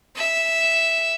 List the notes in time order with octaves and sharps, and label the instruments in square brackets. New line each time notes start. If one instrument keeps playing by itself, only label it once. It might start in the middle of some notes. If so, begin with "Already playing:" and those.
[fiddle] E5